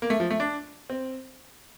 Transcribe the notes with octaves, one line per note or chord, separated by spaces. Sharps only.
A#3
A3
F3
A3
D4
C4